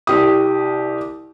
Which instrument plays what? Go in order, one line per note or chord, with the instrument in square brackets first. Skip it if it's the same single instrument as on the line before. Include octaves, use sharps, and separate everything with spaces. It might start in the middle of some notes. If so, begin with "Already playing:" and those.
[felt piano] C2 G4 D#6